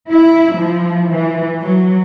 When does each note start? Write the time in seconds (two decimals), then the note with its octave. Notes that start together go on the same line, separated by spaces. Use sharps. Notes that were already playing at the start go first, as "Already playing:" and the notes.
0.11 E4
0.56 F3
1.10 E3
1.61 F#3